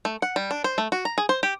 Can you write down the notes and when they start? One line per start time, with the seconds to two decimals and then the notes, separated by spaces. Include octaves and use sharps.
0.05 A3
0.22 F#5
0.36 G3
0.51 D4
0.64 C5
0.78 A3
0.92 F#4
1.05 A#5
1.18 G#4
1.29 C5
1.43 G4